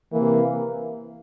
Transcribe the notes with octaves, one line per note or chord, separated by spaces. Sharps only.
C3 E3 A#3